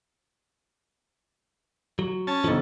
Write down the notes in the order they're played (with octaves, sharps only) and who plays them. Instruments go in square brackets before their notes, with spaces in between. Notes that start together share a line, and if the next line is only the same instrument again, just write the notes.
[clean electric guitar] F#3
[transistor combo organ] C#4 A5
[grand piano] B1 D3 [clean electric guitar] F3